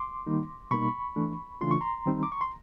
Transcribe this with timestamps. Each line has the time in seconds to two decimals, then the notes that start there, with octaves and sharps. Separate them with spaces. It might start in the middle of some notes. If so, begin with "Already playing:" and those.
Already playing: C6 D6
0.27 D#3 G3 A#3 D#4
0.71 B2 G3 A#3 D#4 B5 C#6
1.16 E3 A3 D4
1.61 C#3 E3 A3 D4 F4 C6
1.71 C#6
1.81 A#5 C6
2.06 D#3 G3 C4 D#4
2.23 D6
2.32 C#6
2.41 C6